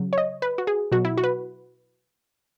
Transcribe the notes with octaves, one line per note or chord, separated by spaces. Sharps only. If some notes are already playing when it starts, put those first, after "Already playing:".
Already playing: C#3 F#3
C#5
D#5
B4
F#4
G#4
B2 F#3 F#4
E4
F#4
B4